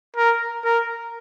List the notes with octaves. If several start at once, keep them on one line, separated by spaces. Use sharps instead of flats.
A#4
A#4